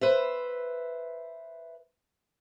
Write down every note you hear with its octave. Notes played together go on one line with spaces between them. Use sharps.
B4 C5 E5